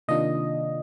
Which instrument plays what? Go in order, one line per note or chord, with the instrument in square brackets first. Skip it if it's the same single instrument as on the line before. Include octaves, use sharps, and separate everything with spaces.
[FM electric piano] C3 D#3 A#3 D4 F4 D#5